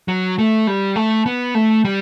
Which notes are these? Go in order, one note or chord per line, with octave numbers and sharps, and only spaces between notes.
F#3
A3
G3
A3
B3
A3
G3